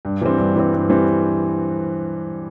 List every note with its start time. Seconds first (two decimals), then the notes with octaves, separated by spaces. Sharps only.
0.05 G2
0.21 E3 G3 C4
0.38 G2
0.56 E3 G3 C4
0.73 G2
0.90 E3 G3 C4